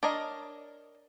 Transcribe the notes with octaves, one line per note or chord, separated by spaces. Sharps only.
D4 A#4 C#5 D#5 A#5